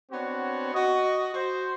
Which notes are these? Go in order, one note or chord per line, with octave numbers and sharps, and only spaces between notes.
B3 C4 D4 F#4 C#5
F#4 D#5
F#4 C5